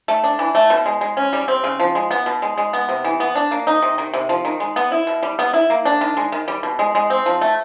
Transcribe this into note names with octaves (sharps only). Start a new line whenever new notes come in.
A3
D4
E3
A3
B2
G#3
G#3
C#4
G3
C4
C#3
F3
G#3
B3
B2
G#3
G#3
B3
C3
E3
B3
D4
A#3
D#4
C3
D#3
C3
F3
D#3
G#3
B3
E4
B2
G3
B3
E4
A#3
D4
D#3
G#3
D#3
G3
B2
G#3
G#3
C4
F3
A3